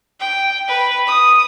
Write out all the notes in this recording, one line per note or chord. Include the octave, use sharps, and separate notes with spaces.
G5
B4
D#6